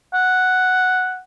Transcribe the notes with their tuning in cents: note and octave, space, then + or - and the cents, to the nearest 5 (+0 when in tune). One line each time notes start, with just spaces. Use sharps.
F#5 +0